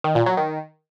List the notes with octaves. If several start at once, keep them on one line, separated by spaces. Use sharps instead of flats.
D#3
A#2
F#3
D#3